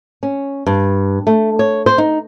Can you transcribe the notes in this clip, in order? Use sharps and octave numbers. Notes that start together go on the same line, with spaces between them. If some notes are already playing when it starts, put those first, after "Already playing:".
C#4
G2
A3
C#5
C5
D#4